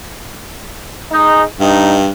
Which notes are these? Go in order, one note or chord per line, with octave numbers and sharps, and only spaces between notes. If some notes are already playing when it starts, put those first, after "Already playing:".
G#3 D#4
G2 D#4